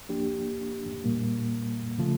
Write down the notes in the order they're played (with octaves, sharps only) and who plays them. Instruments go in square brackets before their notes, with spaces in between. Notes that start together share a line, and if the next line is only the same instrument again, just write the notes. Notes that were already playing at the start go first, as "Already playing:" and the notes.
[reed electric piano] F3 A#3 D4 G4
A#2 G3 A#3
C#3 F3 A3